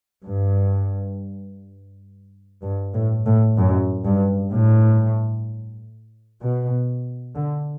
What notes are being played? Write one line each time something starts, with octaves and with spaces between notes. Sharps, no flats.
G2
G2
A2
A2
F#2
G2
A2
B2
D3